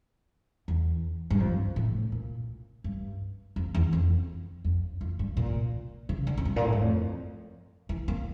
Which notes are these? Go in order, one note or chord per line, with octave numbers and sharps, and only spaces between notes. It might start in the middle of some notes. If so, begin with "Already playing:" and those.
E2
G2
F2
A2
A#2
G2
F2
E2
F2
F2
F2
G2
A#2
C#3
D3
F2
G2
A#2
A2
G2
F2
E3
A#3